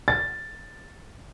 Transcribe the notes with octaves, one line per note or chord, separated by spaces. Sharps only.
A6